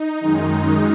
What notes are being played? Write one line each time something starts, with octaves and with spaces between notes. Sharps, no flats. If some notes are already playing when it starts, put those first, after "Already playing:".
Already playing: D#4
F#2 D#3 G#3